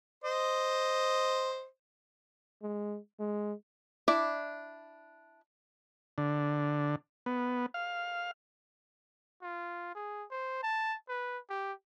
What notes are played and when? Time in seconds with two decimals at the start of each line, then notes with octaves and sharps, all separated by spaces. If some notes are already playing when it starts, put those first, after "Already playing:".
0.24 C5 D#5
2.63 G#3
3.20 G#3
4.08 D4 E4 D5
6.18 D3
7.26 B3
7.74 F5
9.42 F4
9.95 G#4
10.30 C5
10.63 A5
11.08 B4
11.49 G4